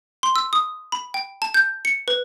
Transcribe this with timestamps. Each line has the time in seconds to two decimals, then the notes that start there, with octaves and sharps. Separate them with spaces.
0.23 C6
0.36 E6
0.53 D#6
0.92 B5
1.14 G5
1.42 A5
1.54 G6
1.85 C#7
2.08 B4